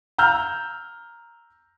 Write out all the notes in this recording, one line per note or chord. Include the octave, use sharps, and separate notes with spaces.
A#5 E6 F6 G6